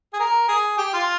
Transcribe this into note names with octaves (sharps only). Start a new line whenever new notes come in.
G#4
A#4
G#4
G4
F4